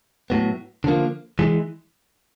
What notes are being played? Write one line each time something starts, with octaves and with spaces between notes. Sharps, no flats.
A2 F#3 B3
D3 F3 A#3
E3 G#3